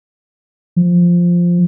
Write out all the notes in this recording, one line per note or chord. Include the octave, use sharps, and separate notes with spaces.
F3